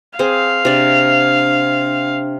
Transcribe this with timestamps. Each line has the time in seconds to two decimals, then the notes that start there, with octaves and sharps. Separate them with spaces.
0.19 C4 G#4 C5 F5
0.65 C3 D4 D5